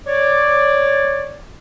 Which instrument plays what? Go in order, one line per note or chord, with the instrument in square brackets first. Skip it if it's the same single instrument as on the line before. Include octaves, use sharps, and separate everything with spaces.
[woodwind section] C#5 D5